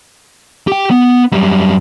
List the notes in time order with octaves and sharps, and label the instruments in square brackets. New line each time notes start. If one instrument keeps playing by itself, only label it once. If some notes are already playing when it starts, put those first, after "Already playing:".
[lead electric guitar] G4 G5
B3
F#2 G3